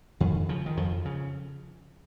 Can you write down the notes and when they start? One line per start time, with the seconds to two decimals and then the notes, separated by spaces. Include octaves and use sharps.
0.20 F2 D#3
0.49 C#3 F3
0.66 D#3
0.77 F2 F3
1.05 C#3